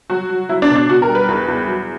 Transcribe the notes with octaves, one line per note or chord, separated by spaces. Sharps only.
F#3 F#4
F#3
F#3 E4
D4
B2
D4
B2 F#4
A#4
G3
B4
E2
E2
F#3